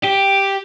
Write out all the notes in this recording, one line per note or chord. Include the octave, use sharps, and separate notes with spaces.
G4